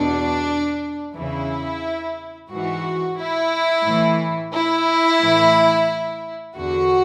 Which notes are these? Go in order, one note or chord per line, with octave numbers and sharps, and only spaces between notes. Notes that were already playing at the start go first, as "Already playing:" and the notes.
Already playing: E2 B2 D4
E2 C#3 E3 E4
G#2 E3 F#4
E4
A2 E3
E4
A2 E3
E2 D3 F#4